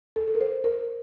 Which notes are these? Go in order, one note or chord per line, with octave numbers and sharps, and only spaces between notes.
A4
A4
A#4
C5
A#4